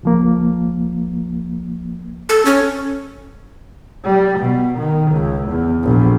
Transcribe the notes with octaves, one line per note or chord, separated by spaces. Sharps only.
C#2 F3 A#3
A4
C#4
G3
B2
D#3
C#2
E2
A#1